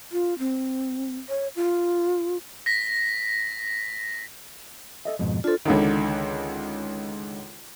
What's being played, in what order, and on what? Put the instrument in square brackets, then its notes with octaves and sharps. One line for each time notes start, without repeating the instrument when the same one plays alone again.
[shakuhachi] F4
C4
C#5
F4
[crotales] A#6 B6
[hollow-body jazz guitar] A4 D#5 E5
F2 G#2 B2
[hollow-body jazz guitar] D4 C5 [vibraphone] F4 A4
[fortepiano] C#2 D3 D#3